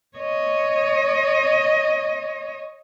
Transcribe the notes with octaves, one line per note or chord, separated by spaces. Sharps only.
C#5 D#5